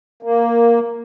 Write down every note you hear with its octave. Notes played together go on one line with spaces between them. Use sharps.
A#3